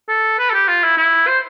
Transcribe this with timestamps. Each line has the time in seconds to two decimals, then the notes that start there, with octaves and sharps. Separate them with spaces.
0.08 A4
0.39 B4
0.50 A4
0.54 G4
0.68 F4
0.83 E4
0.97 E4
1.27 C5